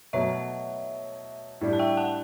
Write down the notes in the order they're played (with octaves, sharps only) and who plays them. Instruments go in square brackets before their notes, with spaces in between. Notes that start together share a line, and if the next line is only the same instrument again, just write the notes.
[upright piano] B2 F#3 A3 [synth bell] C#5 E5
[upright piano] A2 G3 D4
[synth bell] A5
E5 G5
F#5 A5